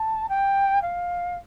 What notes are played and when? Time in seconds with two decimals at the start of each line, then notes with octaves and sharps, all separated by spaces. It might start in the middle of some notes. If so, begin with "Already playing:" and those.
Already playing: A5
0.28 G5
0.81 F5